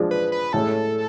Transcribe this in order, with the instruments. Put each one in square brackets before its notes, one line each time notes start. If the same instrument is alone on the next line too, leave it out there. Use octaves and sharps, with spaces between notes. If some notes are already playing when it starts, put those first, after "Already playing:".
Already playing: [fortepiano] F3 G#3 D4 G#4
[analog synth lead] B4
B4
[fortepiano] A2 G#3 C#4 [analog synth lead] A4